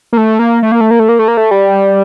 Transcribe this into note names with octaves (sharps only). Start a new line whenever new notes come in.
A#3
A3
A#3
A3
A#3
A3
A#3
A3
A#3
A3
A#3
A3
G3